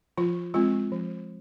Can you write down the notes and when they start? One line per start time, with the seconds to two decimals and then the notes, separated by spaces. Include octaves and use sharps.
0.18 F3 F4
0.54 G#3 C4 F4
0.92 F3